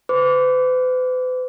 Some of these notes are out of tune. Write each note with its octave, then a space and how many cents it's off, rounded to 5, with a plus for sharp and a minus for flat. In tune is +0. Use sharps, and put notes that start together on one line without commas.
B4 +45 D6 -25